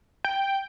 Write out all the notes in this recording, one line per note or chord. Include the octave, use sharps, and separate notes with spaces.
G5